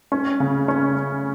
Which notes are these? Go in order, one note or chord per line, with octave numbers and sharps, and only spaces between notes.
C#4
C#3
C#4